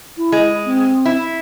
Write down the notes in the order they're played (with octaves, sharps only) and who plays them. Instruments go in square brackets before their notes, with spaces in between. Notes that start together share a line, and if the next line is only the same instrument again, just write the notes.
[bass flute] E4
[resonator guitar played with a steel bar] G#3
[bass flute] C4
[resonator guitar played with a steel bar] E4